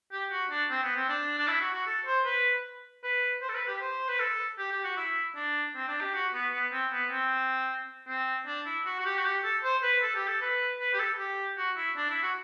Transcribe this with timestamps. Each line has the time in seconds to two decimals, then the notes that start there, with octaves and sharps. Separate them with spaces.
0.12 G4
0.31 F#4
0.50 D4
0.70 C4
0.83 B3
0.96 C4
1.09 D4
1.39 D4
1.48 E4
1.61 F#4
1.73 F#4
1.87 A4
2.06 C5
2.25 B4
3.03 B4
3.42 C5
3.49 A4
3.55 B4
3.68 G4
3.81 C5
4.09 B4
4.20 A4
4.59 G4
4.71 G4
4.84 F#4
4.97 E4
5.36 D4
5.75 C4
5.88 D4
6.01 G4
6.14 F#4
6.33 B3
6.53 B3
6.72 C4
6.92 B3
7.11 C4
8.08 C4
8.47 D4
8.66 E4
8.86 F#4
9.00 F#4
9.05 G4
9.18 F#4
9.25 G4
9.44 A4
9.64 C5
9.83 B4
10.02 A4
10.15 G4
10.28 A4
10.41 B4
10.80 B4
10.93 G4
10.99 A4
11.19 G4
11.57 F#4
11.77 E4
11.97 D4
12.10 E4
12.22 F#4